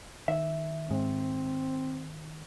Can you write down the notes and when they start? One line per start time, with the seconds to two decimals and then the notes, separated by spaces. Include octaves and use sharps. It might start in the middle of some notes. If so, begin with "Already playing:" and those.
0.28 D#3 E5
0.90 G#2 C4